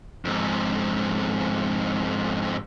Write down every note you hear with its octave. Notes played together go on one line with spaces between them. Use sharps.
F2 G#2